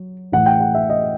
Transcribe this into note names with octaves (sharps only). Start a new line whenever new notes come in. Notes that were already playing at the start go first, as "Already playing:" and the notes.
Already playing: F#3
A2 E3 F#5
G5
F#5
E5
D#5